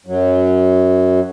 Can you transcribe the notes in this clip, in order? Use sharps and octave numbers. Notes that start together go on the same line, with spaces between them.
F#2 F#3